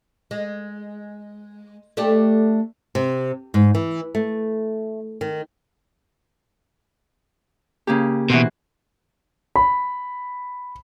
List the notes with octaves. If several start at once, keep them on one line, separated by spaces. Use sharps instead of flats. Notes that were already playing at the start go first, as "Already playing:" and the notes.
G#3
A3 D4 G4
C3
G#2
E3
A3
D#3
C#3 A#3 G4
B2 E3 F#4 C5
B5